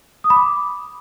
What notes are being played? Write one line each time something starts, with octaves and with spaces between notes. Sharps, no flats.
D#6
B5
D6